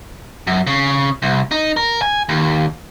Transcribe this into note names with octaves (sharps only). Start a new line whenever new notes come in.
F#2
C#3
C2
D#4
A#4
G#5
D#2